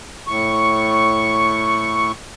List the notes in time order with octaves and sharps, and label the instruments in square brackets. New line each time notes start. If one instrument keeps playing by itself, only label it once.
[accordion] A2 C#6